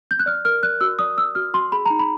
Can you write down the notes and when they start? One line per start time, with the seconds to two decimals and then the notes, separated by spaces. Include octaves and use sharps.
0.11 G6
0.19 F#6
0.26 D5 F6
0.45 A#4 F6
0.63 D5 F#6
0.81 F#4 E6
0.99 D5 D#6
1.17 D5 E6
1.35 F#4 F6
1.53 F#4 C6
1.72 G#4 B5
1.86 D#4 A#5
1.99 B5